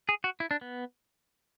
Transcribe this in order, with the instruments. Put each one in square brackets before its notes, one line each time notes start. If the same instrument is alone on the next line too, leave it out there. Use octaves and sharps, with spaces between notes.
[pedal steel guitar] G#4
F#4
E4
D4
B3